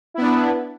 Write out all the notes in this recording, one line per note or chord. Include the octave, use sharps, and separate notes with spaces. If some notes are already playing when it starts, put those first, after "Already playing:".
B3 D4 E4 B4